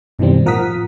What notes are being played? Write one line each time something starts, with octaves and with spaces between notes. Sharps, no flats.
F#2 B2 D#3 E3 G3 C4
A2 F3 A#4 F#5 D#6 B6